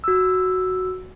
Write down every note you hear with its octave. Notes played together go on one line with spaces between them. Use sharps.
F#4 E6